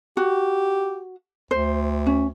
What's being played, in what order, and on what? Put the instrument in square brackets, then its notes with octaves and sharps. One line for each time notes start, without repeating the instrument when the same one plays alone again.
[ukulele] F#4 [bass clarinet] G4
[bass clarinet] D2 [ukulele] C5
[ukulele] C#4